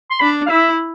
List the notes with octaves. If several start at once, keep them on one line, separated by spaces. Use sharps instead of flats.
C6
D4 B5
F5
E4 E5